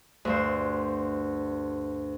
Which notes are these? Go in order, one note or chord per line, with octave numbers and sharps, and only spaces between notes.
D2 G2 C5